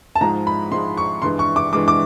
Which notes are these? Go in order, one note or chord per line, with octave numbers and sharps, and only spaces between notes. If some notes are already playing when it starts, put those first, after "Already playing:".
A5
G#2 F3 G#3 A#5
B5
G#2 F3 G#3 C6
C#6
G2 E3 G#3 C6
C#6
D6
G2 E3 G#3 D6
D6